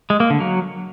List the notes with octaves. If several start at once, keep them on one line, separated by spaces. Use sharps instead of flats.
G#3
A#3
D3
F#3